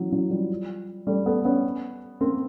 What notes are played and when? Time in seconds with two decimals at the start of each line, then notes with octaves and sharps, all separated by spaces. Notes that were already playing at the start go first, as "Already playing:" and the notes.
Already playing: E3 F#3
0.12 E3 F#3
0.30 F3 G3
1.07 G3 A3
1.26 A3 B3
1.45 B3 C#4
2.21 A#3 C4